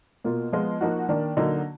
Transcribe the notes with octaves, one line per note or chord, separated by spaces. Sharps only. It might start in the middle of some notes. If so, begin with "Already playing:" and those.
B2 A#3 F4
F3 G#3 B3 F4
F3 A#3 D#4 F#4
D#3 A#3 D4
D3 F#3 A#3 D#4